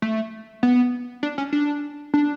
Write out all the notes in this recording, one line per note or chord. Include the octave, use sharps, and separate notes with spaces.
A3
B3
D4
C#4
D4
D4